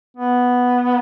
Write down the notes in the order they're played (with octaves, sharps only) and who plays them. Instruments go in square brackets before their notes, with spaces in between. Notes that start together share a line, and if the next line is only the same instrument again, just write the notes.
[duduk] B3